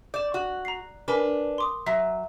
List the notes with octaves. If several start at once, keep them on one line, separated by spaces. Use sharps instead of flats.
D5 G6 E7
F#4
A#5 C7
D4 A#4 B4 G#5 B5
C6 D6 D#6
F#3 E5